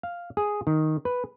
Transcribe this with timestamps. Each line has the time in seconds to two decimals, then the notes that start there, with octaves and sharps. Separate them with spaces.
0.03 F5
0.37 G#4
0.67 D#3
1.05 B4